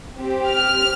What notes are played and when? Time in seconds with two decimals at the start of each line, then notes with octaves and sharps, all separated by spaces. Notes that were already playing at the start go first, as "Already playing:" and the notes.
0.18 C4 G4
0.51 F6